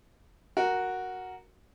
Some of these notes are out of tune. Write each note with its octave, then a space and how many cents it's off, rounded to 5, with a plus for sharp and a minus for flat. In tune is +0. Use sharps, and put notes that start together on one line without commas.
F#4 +0 A#4 +0